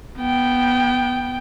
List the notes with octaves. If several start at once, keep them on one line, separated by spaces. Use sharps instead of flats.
B3 G5